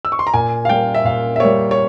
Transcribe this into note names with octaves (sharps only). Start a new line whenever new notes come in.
E6
C#6
C6
A#5
A#2 G#5
F5
G3 A#3 G5
E5
A#2 F5
E5
G3 A#3 C#5
C#5